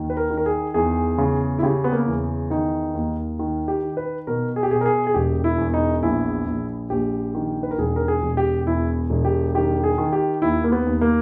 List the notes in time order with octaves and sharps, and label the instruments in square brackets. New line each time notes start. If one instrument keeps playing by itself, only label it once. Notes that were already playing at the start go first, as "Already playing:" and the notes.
Already playing: [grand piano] D#2 D#3
B4
A#4
D#3
A#4
G#4
E2 G#4
C#3
E4
C#3 G4
B3
A#3
E2
D#3 D#4
D#2
D#3
G4
D#3
B4
B2 A#4
G#4
G4
B2 G#4
A#4
G#4
G#4
E1 G4
E4
E2
D#4
A#1 E4
A#1
A#1 G4
D#3
B4
A#4
E1 G#4
A#4
G#4
E1
G4
E2 E4
E1
G4
D#3 G4
G#4
D#3
G4
D#2 E4
A#3
B3
D#2
A#3